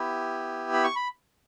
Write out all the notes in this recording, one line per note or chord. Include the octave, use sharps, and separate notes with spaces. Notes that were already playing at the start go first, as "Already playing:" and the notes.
Already playing: B3 E4 G4
B5
C#6
B5